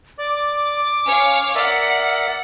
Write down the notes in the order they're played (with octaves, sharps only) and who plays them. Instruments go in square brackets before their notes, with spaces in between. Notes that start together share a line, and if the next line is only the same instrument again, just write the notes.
[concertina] D5 [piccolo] D6
[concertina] C#4 [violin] C#5 F5
[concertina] A#4 D5 E5 [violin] F#5